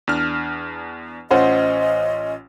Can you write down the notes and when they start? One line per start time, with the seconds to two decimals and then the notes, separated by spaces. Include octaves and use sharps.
0.07 E2 D4 F6
1.31 A1 C#4 F4 C5 D#5 F#5 C6